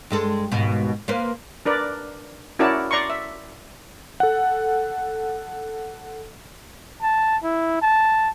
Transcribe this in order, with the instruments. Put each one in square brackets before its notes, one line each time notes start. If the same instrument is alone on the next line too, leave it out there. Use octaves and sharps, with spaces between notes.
[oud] G2 G#3 A4
D#2 G#2 B2
A#3 B4 C5
[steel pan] D4 A#4 B4 D5
C#4 E4 F#4 A#4 D5 A5
D5 A#5 C6 C#6
E5
[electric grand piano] A4 F#5
[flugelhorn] A5
E4
A5